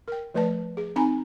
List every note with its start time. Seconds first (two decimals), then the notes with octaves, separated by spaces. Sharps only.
0.08 A#4 G5
0.34 F3 A3 B4 D5 A5
0.77 G#4
0.96 C4 D#4 G#5 A#5 B5